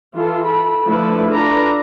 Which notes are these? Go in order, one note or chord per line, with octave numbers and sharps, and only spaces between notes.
E3 F4 A4
A4 B5
D3 F3 A3 E4 A4 B4
D4 F4 A4 B4 D5 A#5